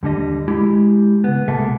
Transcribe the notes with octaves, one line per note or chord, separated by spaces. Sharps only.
D#2 D3 G3 D#5
G#3 E4 G4
C#3 B3
C2 B2 G#3 A#3 A4 E5